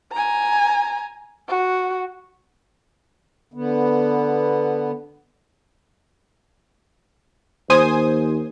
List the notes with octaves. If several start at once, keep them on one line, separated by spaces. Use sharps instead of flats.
G#5 A#5
F#4
D3 B3
D#2 C5 G#5 D#6